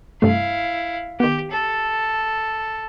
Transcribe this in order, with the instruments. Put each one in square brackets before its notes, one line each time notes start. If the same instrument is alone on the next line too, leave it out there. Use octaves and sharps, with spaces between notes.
[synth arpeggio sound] G2 C3 A3 [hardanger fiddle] E4 F5
[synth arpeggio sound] D#3 B3 [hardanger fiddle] G4
[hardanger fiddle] A4